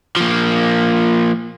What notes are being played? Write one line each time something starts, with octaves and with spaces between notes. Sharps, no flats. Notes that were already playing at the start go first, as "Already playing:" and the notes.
F3 A#3